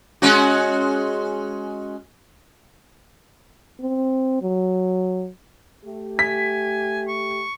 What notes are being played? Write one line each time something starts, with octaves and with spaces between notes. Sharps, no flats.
G#3 C#4 F#4
C4
F#3
A3 G4
G#5 B6
C#6